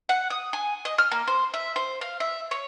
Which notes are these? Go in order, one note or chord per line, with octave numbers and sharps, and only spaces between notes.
F#5
D#6
G#5
D#5
F6
A#3
C5
E5
C5
F5
E5
C#5